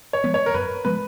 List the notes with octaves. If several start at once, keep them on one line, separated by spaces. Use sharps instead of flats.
C#5
F3 G#3 B3
C#5
A#4
F#2 B4
F3 G#3 B3 B4